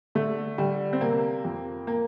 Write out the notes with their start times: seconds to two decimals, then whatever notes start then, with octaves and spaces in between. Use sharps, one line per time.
0.15 D3 A3
0.58 D3 G3
0.93 C4
1.01 C3 A#3
1.45 F2
1.87 A#3